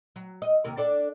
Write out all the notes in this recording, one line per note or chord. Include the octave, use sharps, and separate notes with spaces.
F#3
D#5
D#2 C3 A#4
D4 A4 D5